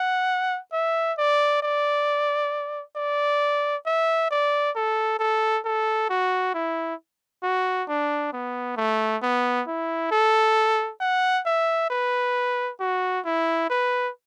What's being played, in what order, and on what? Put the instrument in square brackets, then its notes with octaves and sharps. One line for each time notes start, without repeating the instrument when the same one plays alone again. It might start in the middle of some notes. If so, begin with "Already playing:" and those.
Already playing: [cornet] F#5
E5
D5
D5
D5
E5
D5
A4
A4
A4
F#4
E4
F#4
D4
B3
A3
B3
E4
A4
F#5
E5
B4
F#4
E4
B4